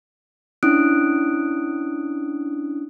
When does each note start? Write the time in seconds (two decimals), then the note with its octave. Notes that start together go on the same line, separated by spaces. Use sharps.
0.63 C#4 D4 E4 D#6 F#6 D7